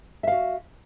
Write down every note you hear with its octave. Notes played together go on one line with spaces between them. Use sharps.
F#4 E5 F5